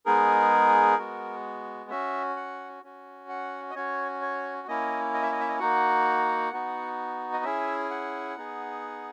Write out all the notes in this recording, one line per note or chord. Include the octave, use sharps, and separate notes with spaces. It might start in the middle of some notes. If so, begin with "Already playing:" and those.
G#3 B3 D#4 G#4 A#4
G#3 B3 F#4
C#4 F#4 E5
F#5
C#4 F#4
F#5
D#5
C#4 F#4 C#5
C#5
A#3 C#4 E4 D#5
D#5
E5
D#5
E5
D#5
A#3 D#4 F#4 F#5
B3 D#4 F#4
D#5
C#4 E4 G#4 E5
F#5
B3 D#4 G#4